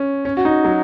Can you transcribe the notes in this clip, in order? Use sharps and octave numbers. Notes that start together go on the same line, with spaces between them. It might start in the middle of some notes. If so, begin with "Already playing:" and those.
Already playing: C#4
C#4
F#4
D#4
F#3